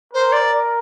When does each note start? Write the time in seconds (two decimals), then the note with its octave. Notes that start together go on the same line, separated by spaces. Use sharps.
0.13 A#4 C5
0.32 D5